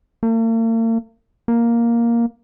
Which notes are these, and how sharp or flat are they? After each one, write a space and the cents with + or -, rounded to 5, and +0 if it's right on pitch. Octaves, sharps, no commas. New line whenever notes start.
A#3 -45
A#3 +5